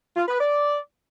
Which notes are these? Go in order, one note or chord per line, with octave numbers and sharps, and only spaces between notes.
F4
B4
D5